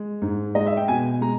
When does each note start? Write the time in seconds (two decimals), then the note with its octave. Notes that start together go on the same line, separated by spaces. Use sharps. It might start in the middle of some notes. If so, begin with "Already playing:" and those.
Already playing: G#3
0.22 G#2
0.55 G#3 D#5
0.67 E5
0.77 G5
0.88 B2 G#5
1.21 G#3 A#5